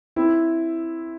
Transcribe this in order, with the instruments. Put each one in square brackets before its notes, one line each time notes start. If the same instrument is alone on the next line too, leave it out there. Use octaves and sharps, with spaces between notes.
[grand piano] C4 E4